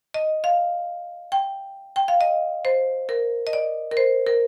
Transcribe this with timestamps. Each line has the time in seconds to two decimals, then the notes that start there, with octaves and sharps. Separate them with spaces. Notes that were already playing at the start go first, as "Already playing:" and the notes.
0.14 D#5
0.44 F5
1.32 G5
1.96 G5
2.08 F5
2.21 D#5
2.65 C5
3.09 A#4
3.47 D#5
3.53 D5
3.92 A#4
3.97 C5
4.27 A#4